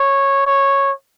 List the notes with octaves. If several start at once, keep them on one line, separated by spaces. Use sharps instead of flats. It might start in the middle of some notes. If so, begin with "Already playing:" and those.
Already playing: C#5
C#5